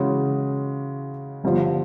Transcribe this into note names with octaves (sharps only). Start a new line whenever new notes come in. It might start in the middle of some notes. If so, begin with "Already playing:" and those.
Already playing: C#3 E3 G#3 C#4 F#4
G1 G2 D3 F3